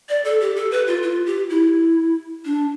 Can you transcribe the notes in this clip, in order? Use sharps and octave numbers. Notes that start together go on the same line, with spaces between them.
D5
A4
G4
A4
B4
F4
F4
G4
E4
D4